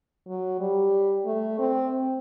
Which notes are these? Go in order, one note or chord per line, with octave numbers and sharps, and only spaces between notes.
F#3
G3
A3
C4